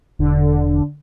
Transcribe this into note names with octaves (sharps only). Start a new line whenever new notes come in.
E1 D3